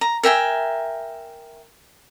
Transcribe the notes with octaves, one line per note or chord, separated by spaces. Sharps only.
A#5
A#4 E5 G5 G#5